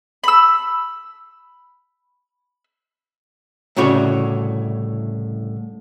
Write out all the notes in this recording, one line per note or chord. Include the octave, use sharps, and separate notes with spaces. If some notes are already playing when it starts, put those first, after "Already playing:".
B5 E6
C2 A2 C#3 F#4 C#5 D5